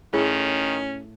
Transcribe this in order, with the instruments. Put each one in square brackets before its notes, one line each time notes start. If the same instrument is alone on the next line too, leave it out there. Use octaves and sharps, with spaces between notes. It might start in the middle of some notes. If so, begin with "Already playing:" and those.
[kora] A2 [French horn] D#3 [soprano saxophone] C#4 [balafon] G#4